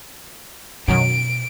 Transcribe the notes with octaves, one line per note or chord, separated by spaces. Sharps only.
F#2 B2 D#3 F#3 D7